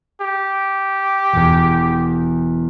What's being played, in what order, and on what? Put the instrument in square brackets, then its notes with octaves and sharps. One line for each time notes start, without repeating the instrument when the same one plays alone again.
[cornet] G4
[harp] E1 E2